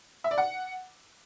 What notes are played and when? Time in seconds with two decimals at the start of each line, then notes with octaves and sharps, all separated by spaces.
0.24 E5
0.31 D5
0.38 F#5